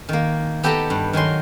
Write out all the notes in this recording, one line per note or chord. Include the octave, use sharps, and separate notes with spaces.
D#3 A#3
B3 G4 A4 G5 A5 A#5
G2
D#3 F#3 G#5 C6